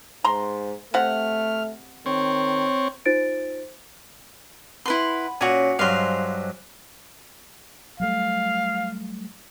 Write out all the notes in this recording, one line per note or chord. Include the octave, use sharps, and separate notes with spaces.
G#2 A#5 C6
C3 A3 F#5 F6
D#3 C4 C#5
D#4 F4 C5 A6 D7
E4 B4 F#5 B5 C6
A#2 C#4 F#4 C#5 G#5
G2 F#3 C5 D#5 F5 G#5 C6
F#3 G3 A3 F5